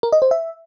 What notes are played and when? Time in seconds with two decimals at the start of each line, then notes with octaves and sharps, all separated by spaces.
0.03 A#4
0.12 D#5
0.22 C5
0.31 E5